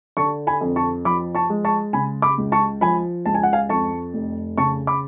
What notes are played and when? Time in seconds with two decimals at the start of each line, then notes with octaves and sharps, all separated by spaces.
0.17 D3 A5 C#6
0.47 G#5 B5
0.61 F2
0.76 A5 C#6
1.05 F3 B5 D6
1.35 A5 C#6
1.50 G#3
1.65 A5 C#6
1.93 C#3 G#5 B5
2.22 B5 D6
2.38 C#2
2.52 A5 C#6
2.81 F3 G#5 B5
3.26 C#2 A5
3.35 G#5
3.43 F#5
3.53 F5 G#5
3.69 F2 A5 C#6
4.14 F1
4.58 C#3 A5 C#6
4.87 B5 D6